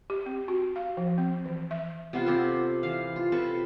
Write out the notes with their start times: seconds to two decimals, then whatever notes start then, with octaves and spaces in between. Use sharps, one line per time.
0.10 G4
0.26 C4
0.48 F#4
0.76 F5
0.97 F3
1.18 C4
1.46 E3
1.71 E5
2.13 C3 B3 F4
2.26 C4 G4 A4
2.83 E3 F5
3.16 F4
3.32 C3 A4 B4 C#6